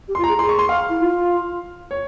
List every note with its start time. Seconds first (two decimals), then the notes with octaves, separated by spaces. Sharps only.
0.08 G4
0.15 F4 C6
0.24 A#5
0.29 G#4
0.39 G#4 C6
0.49 C#6
0.59 C6
0.69 F5
0.89 E4
1.00 F4
1.91 C#5